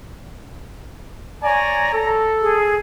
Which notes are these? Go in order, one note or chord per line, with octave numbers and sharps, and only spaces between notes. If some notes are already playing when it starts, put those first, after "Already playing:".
C#5 D5 G#5 A#5
A4
G#4